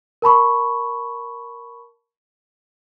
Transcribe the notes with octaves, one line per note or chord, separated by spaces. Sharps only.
A#4 A5 B5 C#6